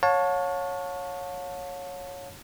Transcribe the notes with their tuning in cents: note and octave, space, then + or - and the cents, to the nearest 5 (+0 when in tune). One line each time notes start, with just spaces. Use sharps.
C#5 +0 F5 +45 A5 +5